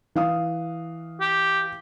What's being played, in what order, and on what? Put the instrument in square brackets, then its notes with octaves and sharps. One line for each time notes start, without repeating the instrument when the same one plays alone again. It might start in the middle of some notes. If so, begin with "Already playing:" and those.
[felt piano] E3 F5 D#6
[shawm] G4